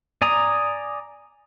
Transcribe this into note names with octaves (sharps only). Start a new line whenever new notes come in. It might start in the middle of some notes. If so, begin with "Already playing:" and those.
D5 G#5 A#5 D#6